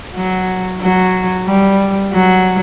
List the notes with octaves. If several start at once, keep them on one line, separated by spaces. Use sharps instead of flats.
F#3
F#3
G3
F#3